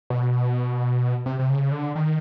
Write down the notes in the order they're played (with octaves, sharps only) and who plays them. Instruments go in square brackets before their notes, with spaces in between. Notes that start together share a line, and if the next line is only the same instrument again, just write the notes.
[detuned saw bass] B2
C3
C3
C#3
D3
D#3